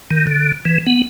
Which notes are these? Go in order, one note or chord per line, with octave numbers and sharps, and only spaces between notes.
D#3
D3
E3
B3